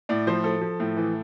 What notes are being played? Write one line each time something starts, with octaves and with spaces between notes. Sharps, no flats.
A2 D5
F3 C5
F3 A4
F3
A2
E3